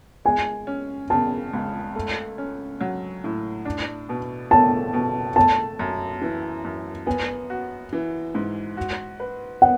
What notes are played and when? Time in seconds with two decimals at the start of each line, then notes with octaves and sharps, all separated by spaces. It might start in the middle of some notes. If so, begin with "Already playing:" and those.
0.25 G#3 G#5
0.67 C#4
1.10 C#3 A5
1.53 C#2
1.95 A3
2.38 C#4
2.80 F#3
3.24 A2
3.65 D4
4.09 B2
4.51 A3 A5
4.93 B2
5.36 A3 A5
5.79 F#2
6.21 E3
6.65 F#2
7.06 B3 G#5
7.50 F#4
7.93 E3
8.34 G#2
8.77 F#4
9.20 B4
9.62 B3 F#5